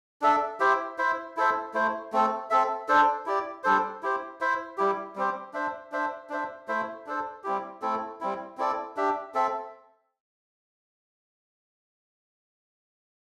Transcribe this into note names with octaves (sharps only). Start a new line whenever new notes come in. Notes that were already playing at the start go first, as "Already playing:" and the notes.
D4 A4 E5
E4 G4 C5 E5
E4 C5 E5
E4 A4 C5 E5
A3 E4 C5
A3 C4 A4
C4 A4 E5
D4 A4 C5
E4 G4 D5
G3 D4 A4 C5
E4 G4 C5
E4 C5 E5
G3 E4 G4
G3 C4 G4 C5
D4 C5 E5
D4 C5 E5
D4 C5 E5
A3 E4 C5 E5
D4 A4 C5
G3 C4 E4 G4
A3 C4 E4 A4
G3 C4 E4
C4 E4 A4 D5
D4 G4 E5
C4 A4 E5